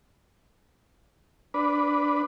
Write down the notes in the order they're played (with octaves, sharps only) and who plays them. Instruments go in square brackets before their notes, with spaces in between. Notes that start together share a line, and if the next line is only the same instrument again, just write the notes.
[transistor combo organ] D4 B4